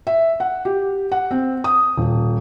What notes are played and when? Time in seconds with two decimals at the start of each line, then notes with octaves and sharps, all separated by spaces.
0.07 E5
0.40 F#5
0.65 G4
1.12 F#5
1.31 C4
1.64 D#6
1.97 D#1